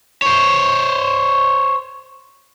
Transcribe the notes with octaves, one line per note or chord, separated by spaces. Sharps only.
C5 C#5